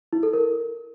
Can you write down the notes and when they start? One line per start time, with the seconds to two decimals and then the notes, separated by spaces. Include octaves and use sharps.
0.13 E4
0.23 A4
0.33 A#4